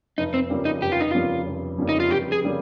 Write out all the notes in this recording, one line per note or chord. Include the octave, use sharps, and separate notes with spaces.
F1 D#4
C4
F2 C#3 G3 A#3
D#4
F1 G4
F4
D#4
F2 C#3 G3 A#3 F4
F1
F2 C#3 G3 A#3
D#4
F4
F1 G4
G#4
C#3 G3 A#3